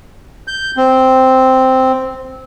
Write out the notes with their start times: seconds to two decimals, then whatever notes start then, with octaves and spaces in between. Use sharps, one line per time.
0.47 G6
0.77 C4